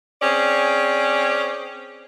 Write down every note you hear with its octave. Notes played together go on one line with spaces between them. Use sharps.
C4 C#4 G#4 D5